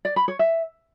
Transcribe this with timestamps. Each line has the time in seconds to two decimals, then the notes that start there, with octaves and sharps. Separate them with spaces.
0.05 D5
0.16 B5
0.28 C#5
0.39 E5